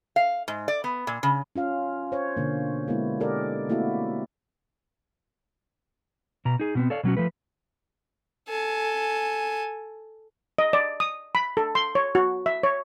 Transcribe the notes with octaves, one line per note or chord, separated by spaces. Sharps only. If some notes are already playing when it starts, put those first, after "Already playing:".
F5
G#2
D5
B3
A#2
C#3
C#4 F4 F5
C5 C#5
B2 D3 A#3
G#3 A#3 B3 E4
G4 A4 A#4 D5 D#5
A3 A#3 C4 E4 F#4 E5
B2 A#5
D#4 G#4
B2 B3 C4
A4 C#5 D5 F5
B2 F#3 C#4 F#4
F3 A3 B4
A4 G#5
D#5
D5
D#6
B5
A4
C6
C#5
F#4
E5
C#5